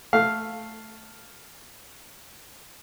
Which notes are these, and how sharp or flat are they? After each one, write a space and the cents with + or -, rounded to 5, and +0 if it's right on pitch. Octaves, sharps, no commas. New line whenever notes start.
A3 +0 F5 +0